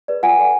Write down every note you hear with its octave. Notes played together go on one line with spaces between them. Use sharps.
G#4 B4 D5
F4 F#5 G#5
A4 D5